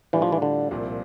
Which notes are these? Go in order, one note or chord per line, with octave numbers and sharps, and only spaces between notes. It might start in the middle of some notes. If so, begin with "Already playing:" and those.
A2 E3 G3 D4 F4
F3
E3
D3
C2 A#2 F3 C4